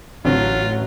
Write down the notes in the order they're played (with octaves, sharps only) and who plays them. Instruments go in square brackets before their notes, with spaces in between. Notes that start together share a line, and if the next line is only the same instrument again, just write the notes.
[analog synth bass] A1 [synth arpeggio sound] D3 C4 D4 [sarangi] F#3 [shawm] F4